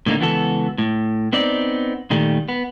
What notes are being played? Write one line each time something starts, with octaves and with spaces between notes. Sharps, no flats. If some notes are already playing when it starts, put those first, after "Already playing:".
A2 D3 G3 A#3 D#4
C#2 E3 B3 F#4 A4
A2
B3 C4 D#4 D5
A#2 D#3 G3 A3
B3